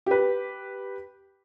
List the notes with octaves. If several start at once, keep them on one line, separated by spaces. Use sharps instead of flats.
G4 B4